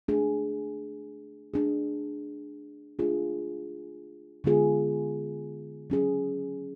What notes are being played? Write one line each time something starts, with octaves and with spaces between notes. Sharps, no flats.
A3 D4 G#4
A3 D4 G#4
A3 D4 F4 G#4
D3 G#3 B3 F4 G#4
F#3 C#4 G#4